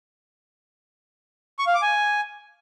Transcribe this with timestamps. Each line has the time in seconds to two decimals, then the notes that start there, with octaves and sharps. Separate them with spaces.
1.59 C#6
1.67 F5
1.74 D6
1.82 G#5